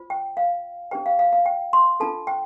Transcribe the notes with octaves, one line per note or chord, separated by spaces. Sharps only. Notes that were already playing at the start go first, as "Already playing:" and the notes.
Already playing: F4 C5
G5
F5
D4 G4 C5 G5
F5
F5
F5
G5
C6
D4 F4 A4 A5
G5